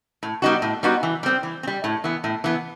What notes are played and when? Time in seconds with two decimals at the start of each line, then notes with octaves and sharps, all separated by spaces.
0.23 A2
0.42 G3 B3 D#4 F#4
0.62 A2
0.83 G3 B3 D#4 F#4
1.03 E3
1.23 G3 C4
1.43 E3
1.63 C4
1.67 G3
1.84 A2
2.04 E3 B3
2.24 A2
2.44 E3 B3